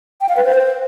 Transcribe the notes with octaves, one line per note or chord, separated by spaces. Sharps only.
G5
F5
B4
C5